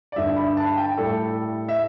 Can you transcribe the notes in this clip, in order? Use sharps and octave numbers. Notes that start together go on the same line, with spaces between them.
D5
G2 D3 G3 E5
B5
A5
G5
A2 G3 A4
E5